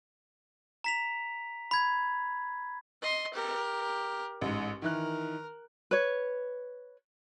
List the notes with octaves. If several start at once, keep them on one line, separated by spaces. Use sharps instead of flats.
A#5 B6 F7
B5 G#6
D#5 C6
G4 A#4
A1 G#2
D#3 E3 A#4 F#6
B4 C#5